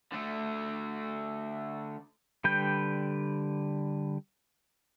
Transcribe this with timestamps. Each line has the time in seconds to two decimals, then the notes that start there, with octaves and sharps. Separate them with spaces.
0.12 D3 A3
2.44 D3 G3 B4 G5 G6